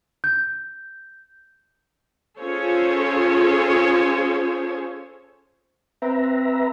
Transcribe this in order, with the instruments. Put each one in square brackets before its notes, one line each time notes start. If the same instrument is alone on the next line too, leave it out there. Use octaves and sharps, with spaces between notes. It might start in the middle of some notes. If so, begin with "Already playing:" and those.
[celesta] G6
[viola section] C#4 F4 G#4 A4 C5 C#5
[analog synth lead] C4 [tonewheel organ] B4 E5 A#5